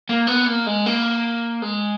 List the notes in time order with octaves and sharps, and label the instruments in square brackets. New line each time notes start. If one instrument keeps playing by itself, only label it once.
[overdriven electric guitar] A#3
B3
A#3
G#3
A#3
G#3